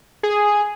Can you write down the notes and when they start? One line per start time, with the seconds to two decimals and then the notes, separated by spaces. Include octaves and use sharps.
0.23 G#4